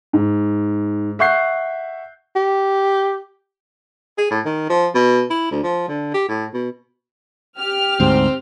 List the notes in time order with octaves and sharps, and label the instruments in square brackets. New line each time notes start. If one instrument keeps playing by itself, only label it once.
[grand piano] G#2
E5 F#5 C#6 F#6 G6 C7
[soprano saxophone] G4
[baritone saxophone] G#4
A2
D#3
F3
B2
E4
D2
F3
D3
G4
A2
B2
[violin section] G4 F6
[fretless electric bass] D2 G#2 [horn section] C4